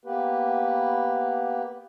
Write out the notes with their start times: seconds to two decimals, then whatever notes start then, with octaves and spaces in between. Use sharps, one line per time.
0.05 A#3 B3 G4 B4